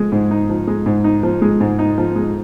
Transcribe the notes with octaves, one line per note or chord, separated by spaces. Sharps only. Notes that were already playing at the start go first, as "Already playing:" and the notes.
Already playing: F3 G#3
G#2
D#4
F3
G#3
G#2
D#4
F3
G#3
G#2
D#4
F3
G#3